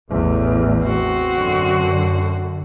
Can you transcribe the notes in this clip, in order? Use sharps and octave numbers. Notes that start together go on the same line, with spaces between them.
A1 E2 A2
C4 F#4
F#2 D3